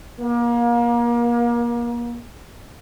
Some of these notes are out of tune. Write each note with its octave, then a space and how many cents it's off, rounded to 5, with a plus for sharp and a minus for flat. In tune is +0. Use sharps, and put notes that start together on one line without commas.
A#3 +30